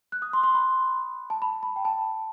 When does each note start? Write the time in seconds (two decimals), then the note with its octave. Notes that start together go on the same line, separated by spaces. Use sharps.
0.12 F#6
0.22 D#6
0.33 C6
0.44 C6
0.54 B5
1.30 A5
1.42 B5
1.63 B5
1.76 G5
1.85 A5